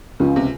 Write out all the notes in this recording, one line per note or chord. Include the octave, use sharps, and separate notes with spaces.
C#2 C#3 F3
C3